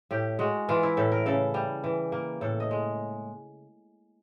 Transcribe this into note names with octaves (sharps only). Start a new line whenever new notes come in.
A2 G4
G#3 F#4
E3 F4
E4
A2 A4
A#4
C#3 A4
G3
E3
A#3
A2 A4
D#5
G#3